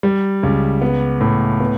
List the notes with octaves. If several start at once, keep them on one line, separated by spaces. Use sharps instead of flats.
G3
C#2
B3
A2
B3